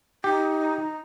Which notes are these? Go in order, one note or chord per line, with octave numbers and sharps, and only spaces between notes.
D#4 G4